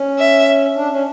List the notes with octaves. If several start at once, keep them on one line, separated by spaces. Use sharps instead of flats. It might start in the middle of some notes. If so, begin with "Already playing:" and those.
Already playing: C#4
E5
D4
C#4